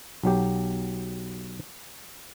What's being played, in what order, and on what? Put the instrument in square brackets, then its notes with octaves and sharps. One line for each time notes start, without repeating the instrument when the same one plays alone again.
[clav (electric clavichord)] B1 F#3 G4